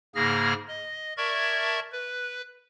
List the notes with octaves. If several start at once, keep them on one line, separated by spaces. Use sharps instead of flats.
G#2 C#3 A#3 G#4 F6 A#6
D#5
A#4 D5 E5 A5 C#6 G#6
B4